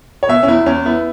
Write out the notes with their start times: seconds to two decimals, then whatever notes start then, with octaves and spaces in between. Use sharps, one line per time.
0.23 C#5
0.29 B2 E5
0.43 C#4
0.48 E2 E4
0.66 E2 C#4
0.85 B3 E4